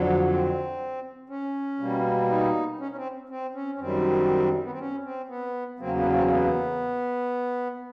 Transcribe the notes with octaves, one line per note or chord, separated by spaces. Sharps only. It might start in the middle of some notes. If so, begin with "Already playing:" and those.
Already playing: F2 D3 F#3
C4
C#4
B2 G3 A#3
D#4
C#4
C#4
C4
C4
C#4
C#4
F#2 D#3 G3 C4
B3
C4
C#4
C4
B3
E2 C#3 F#3 A#3 C4
B3
C4
B3